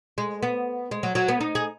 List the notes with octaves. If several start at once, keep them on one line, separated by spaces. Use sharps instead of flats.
G#3
B3
G#3
F#3
F#3
B3
D#4
G#4